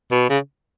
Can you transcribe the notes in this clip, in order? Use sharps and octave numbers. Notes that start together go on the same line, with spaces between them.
B2
C#3